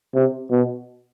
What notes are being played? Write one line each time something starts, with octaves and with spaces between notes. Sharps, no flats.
C3
B2